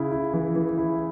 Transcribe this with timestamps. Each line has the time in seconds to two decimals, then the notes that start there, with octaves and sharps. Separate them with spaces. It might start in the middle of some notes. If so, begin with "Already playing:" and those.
Already playing: C#3 E4
0.11 E4
0.33 E3
0.56 E3
0.78 E4